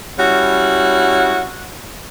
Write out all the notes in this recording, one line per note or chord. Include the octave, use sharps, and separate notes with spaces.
G3 C#4 E4 F#4